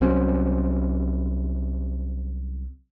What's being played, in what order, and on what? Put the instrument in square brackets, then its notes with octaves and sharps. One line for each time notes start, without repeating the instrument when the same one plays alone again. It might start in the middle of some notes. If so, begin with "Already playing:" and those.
[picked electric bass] C2 F#3 C4 C#4